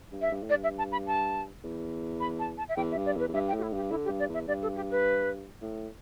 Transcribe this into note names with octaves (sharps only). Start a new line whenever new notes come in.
G2
E5
G2
A2
D5
G2
E5
A5
B5
A5
E2
B5
A5
A5
E5
E2 G5
E5
G2
D5
E2
B4
E2
G2 E5
G5
A2
G4
E4
G2 G4
D3 E4
G4
G2
D5
E2
E5
G2 D5
A4
G4
B4
A2